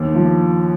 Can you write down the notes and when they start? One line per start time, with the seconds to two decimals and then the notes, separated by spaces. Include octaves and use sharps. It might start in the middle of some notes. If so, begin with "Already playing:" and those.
Already playing: D#2
0.15 F3